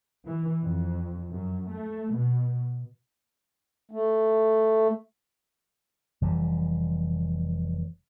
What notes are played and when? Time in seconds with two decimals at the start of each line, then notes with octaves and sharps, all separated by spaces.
0.26 E3
0.62 F2
1.30 F#2
1.71 A3
2.14 B2
3.91 A3
6.21 F1 E3 G3